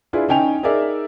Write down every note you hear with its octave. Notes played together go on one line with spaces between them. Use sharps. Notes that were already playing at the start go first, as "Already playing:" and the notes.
D4 E4 F4 G#4 B4
C#4 D#4 G5 G#5 F7
D#4 G#4 A#4 D5 E5